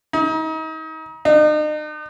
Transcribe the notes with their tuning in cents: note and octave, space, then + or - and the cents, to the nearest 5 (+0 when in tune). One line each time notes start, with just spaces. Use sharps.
D#4 +35
D#4 -40